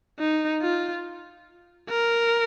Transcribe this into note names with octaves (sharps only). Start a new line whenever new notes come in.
D#4
F4
A#4